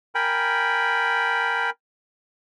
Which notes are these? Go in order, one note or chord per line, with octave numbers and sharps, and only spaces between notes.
A#4 G5 G#5 B5